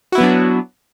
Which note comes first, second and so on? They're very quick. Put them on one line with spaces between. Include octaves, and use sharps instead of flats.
F#4 E4 B3 F#3 D4